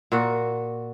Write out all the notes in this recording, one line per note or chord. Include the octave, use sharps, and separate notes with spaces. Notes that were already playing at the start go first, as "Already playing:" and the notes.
A#2 F#4